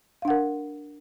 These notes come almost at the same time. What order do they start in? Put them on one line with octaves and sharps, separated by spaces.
F5 D4 F#5 A#4